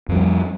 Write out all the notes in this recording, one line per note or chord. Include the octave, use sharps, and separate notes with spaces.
F2 F3 G3